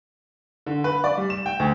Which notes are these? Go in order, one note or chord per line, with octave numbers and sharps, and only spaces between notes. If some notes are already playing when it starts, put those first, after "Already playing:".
D3
B4
D5
G3
E7
G5
D2